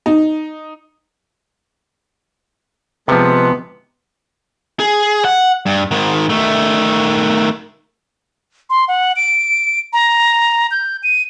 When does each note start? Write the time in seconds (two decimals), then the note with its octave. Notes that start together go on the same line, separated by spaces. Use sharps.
0.06 D#4
3.08 C3 F3 G#3 B3
4.80 G#4
5.25 F#5
5.66 G2
5.91 G#2 D#3
6.30 D#3 A3
8.70 C6
8.88 F#5
9.16 D7
9.93 A#5
10.71 G6
11.03 D#7